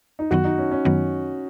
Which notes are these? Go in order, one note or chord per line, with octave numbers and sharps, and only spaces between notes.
D#4
F#2 D#3 F#3 B3 F#4
D#4
C#4
C#4
F#2 D#3 F#3 B3